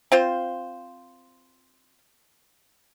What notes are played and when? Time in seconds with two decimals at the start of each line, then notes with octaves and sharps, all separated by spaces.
0.12 C4 F4 C5